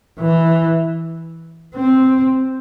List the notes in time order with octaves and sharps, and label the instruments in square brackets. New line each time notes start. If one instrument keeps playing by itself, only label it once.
[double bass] E3
C4